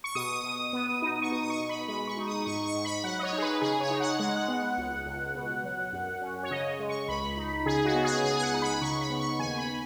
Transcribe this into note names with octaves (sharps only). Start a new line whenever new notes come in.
C#6
B2 D#6
B2
B3
D#4
C#6
B2 D#6
D#6
C#6
B2
B5
G#3 B5
C#6
D#4
D#6
G#2 C#6
C#6
G#2
B5
F#3 F#5
D#5
C#5
D#4
G#4
B4
C#3 G#4
C#5
D#4
F#5
G#3 F#5
B3
C#2
C#2
B2
F#3
F#2
C#4
C#5
C#3 D#5
G#3
C#6
C#2 B5
D#4
C#3 G#4
F#4
B3
G#4
C#2 G#4
G#5
F#5
D#4
B5
C#3 C#6
B5
B3
C#6
D#2 G#5
B5